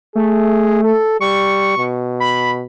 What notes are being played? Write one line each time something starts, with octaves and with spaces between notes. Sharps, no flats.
A3 G#4
A4
G3 C#6
B2
B5